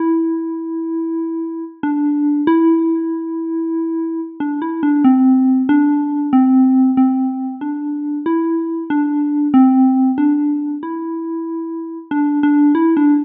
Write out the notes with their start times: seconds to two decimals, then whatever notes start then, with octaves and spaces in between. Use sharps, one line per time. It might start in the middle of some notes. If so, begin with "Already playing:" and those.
Already playing: E4
1.83 D4
2.47 E4
4.40 D4
4.62 E4
4.83 D4
5.04 C4
5.69 D4
6.33 C4
6.97 C4
7.61 D4
8.26 E4
8.90 D4
9.54 C4
10.18 D4
10.83 E4
12.11 D4
12.43 D4
12.75 E4
12.97 D4